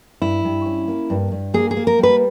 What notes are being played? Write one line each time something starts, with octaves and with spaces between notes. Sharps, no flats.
G2 E4
G2
C#4
A#3
G2
G2
A#3 G#4
G#4
A#3
A#4
G3 B4